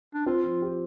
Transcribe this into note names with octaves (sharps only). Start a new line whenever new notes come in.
D4
C4 F4
F3
G4